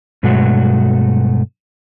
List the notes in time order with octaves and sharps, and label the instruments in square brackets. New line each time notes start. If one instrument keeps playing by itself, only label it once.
[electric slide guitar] G2 B2 F#3 G#3 A3 F#4